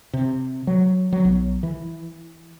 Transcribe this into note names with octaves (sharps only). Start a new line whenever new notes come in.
C3
F#3
F#3
B1
E3